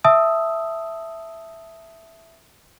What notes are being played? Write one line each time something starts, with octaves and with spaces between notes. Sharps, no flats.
E5 A5 D#6 E6